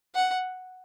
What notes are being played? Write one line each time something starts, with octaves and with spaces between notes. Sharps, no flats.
F#5